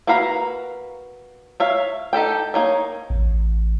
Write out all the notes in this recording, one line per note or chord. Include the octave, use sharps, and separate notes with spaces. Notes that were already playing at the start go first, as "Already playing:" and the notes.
A#3 F#4 B4 F5 A#5
C#5 E5 F5
D#4 G4 A4 G5
A#3 D#4 C#5
A1